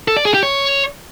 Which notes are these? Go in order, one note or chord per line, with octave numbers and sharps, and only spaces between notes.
A4
D5
G#4
G4
C#5